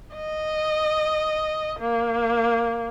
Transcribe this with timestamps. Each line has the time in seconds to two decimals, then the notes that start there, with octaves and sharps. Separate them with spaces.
0.15 D#5
1.79 A#3